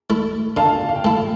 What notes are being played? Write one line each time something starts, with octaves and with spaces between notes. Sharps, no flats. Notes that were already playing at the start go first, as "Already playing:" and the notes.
A3 E4
D3 F5 A5
F5
G5
A3 E4 F5 A5